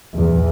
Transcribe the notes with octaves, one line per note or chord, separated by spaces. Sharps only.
E2